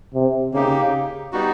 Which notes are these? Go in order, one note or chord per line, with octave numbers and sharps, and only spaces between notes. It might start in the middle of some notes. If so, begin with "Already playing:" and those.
C3
C#3 A#3 D#4 G4
G3 B3 D#4 F#4